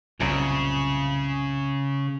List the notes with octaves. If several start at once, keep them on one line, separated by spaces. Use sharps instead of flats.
C2 F#2 A#2 C#3